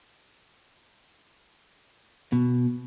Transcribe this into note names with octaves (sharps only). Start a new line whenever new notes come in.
B2